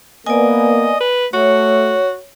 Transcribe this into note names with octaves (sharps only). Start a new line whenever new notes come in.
A#3 B3 D5 D#5 G#5
B4
A3 F#4 C#5